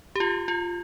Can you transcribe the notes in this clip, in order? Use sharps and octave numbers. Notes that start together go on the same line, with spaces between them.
G4
F4
F4